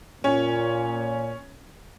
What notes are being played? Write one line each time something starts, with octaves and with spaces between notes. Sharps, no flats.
A#2 C#4